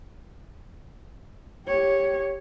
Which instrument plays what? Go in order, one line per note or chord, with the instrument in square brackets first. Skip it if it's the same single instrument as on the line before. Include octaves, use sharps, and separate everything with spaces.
[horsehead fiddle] G4 C#5